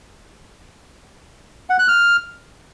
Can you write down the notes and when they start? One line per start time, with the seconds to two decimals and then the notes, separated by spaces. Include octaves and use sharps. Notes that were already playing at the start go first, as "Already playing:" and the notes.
1.70 F#5
1.79 F#6
1.88 F6